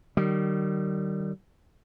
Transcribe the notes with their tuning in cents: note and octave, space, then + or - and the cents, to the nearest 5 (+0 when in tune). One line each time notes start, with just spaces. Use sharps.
D#3 -35 G3 -35